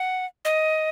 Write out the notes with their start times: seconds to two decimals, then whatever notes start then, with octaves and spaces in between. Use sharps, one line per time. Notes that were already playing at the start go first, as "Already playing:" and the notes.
Already playing: F#5
0.45 D#5